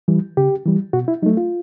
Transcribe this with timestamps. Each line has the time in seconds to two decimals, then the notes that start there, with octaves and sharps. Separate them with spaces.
0.08 E3 G3
0.37 C#3 G4
0.65 E3 G3
0.93 B2 F#4
1.08 E4
1.22 F#3 D#4
1.26 A3
1.37 F4